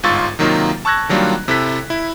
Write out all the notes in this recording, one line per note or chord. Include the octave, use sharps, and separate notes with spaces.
G1 G#2 F4 C#6 E6 A6
C3 D#3 F#3 A#3 D#4 F4
A5 C#6 E6 F#6 G#6 A#6
D#3 F#3 G3 A#3 D4 F4
C3 E4 A4 F#6 B6
E4